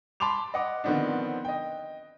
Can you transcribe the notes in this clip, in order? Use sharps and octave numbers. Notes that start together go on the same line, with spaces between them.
A5 B5 C6 D6 F7
D#5 F#5 D6
D3 D#3 F3 B3 C4 D4
D#5 G5